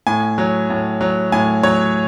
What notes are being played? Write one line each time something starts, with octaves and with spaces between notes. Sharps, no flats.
A2 G#5
F#3
A2
F#3
A2 G#5
F#3 C#5